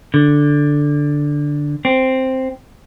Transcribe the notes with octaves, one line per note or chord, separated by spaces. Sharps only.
D3
C4